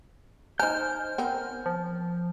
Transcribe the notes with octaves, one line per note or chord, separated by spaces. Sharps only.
D#4 C5 G#5 A#5 F6 G6
B3 C4 A#4
F3